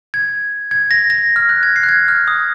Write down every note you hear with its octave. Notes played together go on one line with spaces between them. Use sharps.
G#6
G#6
A#6
A#6
F6
F#6
G#6
C7
F#6
G#6
F6
D#6